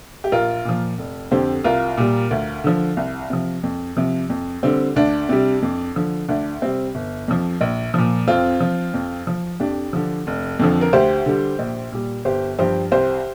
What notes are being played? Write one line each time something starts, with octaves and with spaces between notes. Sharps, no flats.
G4
A#1 F4 A#4
A#2 F3
F1
F2 D3 G4 C5
C2 F4 A#4
A#2 G3
D2
D3 F3
C2
C3 F3
F2
C3 F3
F2
D3 G3 C4
D2 D4
C3 G3
F2
D3 F3
D2 D4
C3 G3 C4
G1
F2 F3
A#1
A#2 F3
F2 C4 F4
F3
F2
F3
F2 D4 G4
D3 F3
F1
F2 D3 F3
A#4
D2 G4 C5
D3 G3
A#1
A#2 G3
G1 G4 C5
G2 F3 G4 C5
C2 G4 C5